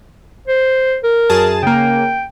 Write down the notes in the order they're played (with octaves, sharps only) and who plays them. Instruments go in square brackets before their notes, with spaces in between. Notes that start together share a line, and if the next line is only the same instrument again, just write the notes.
[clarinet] C5
A#4
[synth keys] F#2 G#4 A5
[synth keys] C#3 A#3 [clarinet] G5